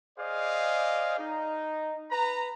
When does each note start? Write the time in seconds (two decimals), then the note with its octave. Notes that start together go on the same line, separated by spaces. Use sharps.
0.19 G#4 C5 D5 D#5 F5
1.19 D#4
2.11 B4 A#5